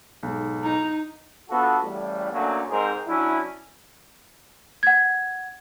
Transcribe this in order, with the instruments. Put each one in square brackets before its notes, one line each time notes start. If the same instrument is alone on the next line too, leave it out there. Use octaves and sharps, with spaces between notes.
[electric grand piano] B1 G#2
[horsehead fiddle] D#4 [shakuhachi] A#5
[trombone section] B3 D4 F4 F#4 A4
A1 A2 C#3 G3
D3 F#3 A3 A#3 C#4
G#2 C4 D#4 G#4 A#4 C5
F#3 C#4 D4 E4
[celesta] F#5 G#6